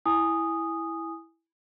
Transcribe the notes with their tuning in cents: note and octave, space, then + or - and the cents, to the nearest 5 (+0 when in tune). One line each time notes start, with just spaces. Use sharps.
E4 +0 G#5 -5 D#6 -5